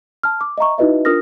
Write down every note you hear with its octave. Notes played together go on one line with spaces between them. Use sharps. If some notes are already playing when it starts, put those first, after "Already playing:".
A5 F6
D6
D#5 E5 A#5 C#6
D#4 E4 F#4 B4 D#5 E5
D4 F4 A#4 D#6 F6 A#6